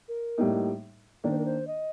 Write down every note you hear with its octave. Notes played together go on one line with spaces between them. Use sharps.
A#4
A2 G3 A#3 D#4
D#3 A#3 D4 D5
C5
A#4
C5
D#5